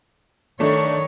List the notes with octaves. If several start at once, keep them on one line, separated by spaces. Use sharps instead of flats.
D#3 A3 D4 C#5